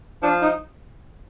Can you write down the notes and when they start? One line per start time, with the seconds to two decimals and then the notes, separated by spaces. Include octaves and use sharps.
0.23 F3 D4
0.42 D#4